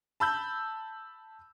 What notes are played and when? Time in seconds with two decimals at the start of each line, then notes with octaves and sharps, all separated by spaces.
0.20 A5 B5 E6 G6